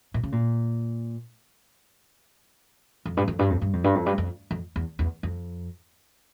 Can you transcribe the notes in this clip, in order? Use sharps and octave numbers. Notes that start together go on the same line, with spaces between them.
A#2
C#3
A#2
F2
G2
F2
G2
F2
G2
F2
G2
F2
G2
F2
F2
E2
E2
F2